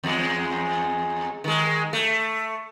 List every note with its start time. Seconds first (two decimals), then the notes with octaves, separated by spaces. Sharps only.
0.03 E2 G#3
1.44 D#3 G#3
1.93 A3